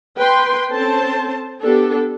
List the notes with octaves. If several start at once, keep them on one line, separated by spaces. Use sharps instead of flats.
B4 G5 C6
C4 C#4 A4 C5 A5
B3 D4 G4 A4